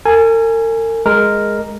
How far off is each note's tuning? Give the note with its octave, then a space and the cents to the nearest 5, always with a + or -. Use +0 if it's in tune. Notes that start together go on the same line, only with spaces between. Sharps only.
A#4 -45 G#5 +0
G#3 +0 A#4 +0